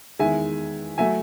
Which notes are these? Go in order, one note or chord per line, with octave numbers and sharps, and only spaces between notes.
E2 D#3 G#3 E5 G#5
F#3 A3 E5 G#5